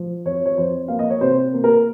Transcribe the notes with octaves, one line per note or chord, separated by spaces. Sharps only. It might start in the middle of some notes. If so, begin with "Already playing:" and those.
Already playing: F3
F2 C#5
C#5
F2 C5
A#3 F5
D#5
C#5
C3 C5
A#3
A#4